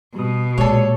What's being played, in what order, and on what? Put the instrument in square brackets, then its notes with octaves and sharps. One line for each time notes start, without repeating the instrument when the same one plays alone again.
[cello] B2 [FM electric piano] G3 D#6
[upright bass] A#2 [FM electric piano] G#3 G4 D5 [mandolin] A4 C#5